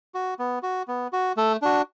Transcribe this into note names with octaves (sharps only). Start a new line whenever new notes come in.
F#4
B3
F#4
B3
F#4
A3 A4
D4 F#4